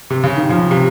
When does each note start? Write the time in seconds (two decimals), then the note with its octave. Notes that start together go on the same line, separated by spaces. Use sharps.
0.10 C3
0.24 C#3
0.36 D#3
0.49 C#3 F3
0.71 C3